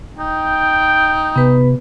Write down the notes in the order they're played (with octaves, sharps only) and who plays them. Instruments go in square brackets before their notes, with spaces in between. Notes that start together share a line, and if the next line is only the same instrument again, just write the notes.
[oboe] D#4 [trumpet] G5
[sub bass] C3 [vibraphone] B3 B4